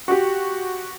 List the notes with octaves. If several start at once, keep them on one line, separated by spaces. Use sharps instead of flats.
F#4 G4